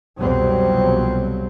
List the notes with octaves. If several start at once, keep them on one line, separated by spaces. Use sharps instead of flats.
C2 F2 B2 F#3 G3 C4